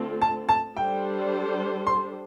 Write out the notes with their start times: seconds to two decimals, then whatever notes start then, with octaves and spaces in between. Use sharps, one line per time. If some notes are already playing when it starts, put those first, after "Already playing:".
Already playing: D3 A3 C4 F4 A4
0.22 A5
0.49 A5
0.77 G3 D4 A4 C5 G5
1.87 C6